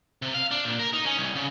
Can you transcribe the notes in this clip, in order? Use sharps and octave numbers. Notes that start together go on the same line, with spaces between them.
C3
F5
D4
A#2
A#4
D#4
C#4
C2
C#3